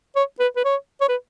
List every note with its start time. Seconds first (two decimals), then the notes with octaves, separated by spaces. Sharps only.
0.16 C#5
0.40 B4
0.56 B4
0.65 C#5
1.01 C#5
1.09 B4